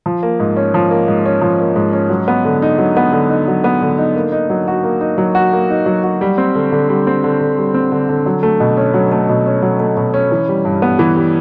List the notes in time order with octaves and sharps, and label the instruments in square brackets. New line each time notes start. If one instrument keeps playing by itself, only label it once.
[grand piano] F3
A#3
G#2
C#4
F3
A#3
G#2
C#4
F3
A#3
G#2
C#4
F#3
B3
D3
D#4
F#3
B3
D3
D#4
F#3
B3
D3
D#4
A#3
D#4
F#3
F#4
A#3
D#4
F#3
F#4
A#3
D#4
F#3
F#4
G3
C4
D3
D3
G3
C4
D3
D3
G3
C4
D3
D3
F#3
A3
B2
C#4
F#3
A3
B2
C#4
F#3
A3
B2
C#4
E3
G3
G2
B3
E3
G3